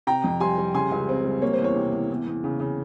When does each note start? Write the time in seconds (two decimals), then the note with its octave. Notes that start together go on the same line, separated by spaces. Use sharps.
0.07 C3 G5 A#5
0.24 F2
0.40 G3 G#5 C6
0.58 G3
0.74 C#3 G#5 C6
0.91 C#2
1.09 C4
1.25 G3
1.42 A#3 C#5
1.53 C5
1.59 E2
1.64 C#5
1.76 C3
1.93 E2
2.10 E2
2.27 E2
2.44 C#3
2.60 C#3